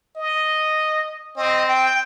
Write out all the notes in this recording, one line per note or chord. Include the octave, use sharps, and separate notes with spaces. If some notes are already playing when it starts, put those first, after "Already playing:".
D#5
C4 D#5
G5